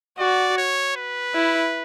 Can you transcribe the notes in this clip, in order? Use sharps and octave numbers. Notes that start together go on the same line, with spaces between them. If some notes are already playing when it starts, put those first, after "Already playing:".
F#4 D5
C#5
B4
E4